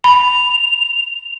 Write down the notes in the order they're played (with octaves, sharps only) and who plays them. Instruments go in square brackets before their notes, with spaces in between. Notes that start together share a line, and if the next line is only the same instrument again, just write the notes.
[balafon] B5 [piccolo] F7